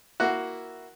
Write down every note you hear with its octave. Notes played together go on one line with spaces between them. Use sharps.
A#3 E4 F#4